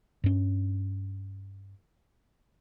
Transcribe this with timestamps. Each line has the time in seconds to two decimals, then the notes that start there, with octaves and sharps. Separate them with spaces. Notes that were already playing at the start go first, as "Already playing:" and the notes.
0.24 G2 C#4